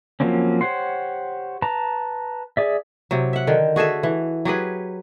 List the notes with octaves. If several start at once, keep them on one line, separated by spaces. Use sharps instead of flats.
F3 F#3 A#3 C4 C#4
G4 C5 C#5 F#5 C6
B4 A5 A#5
G#4 D5 E5
C3 F#3
E5 F#5
D3 D#3 G5
F#4 G#4 A4 E5
E3
F#3 G4 G#4 B4